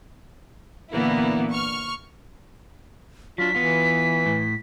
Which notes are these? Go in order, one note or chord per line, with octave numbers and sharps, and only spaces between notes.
A#2 D3 E3 A#3 B3 E4
C#6 F6
F#3 D4 F4 B6
E3 B3 F4
A2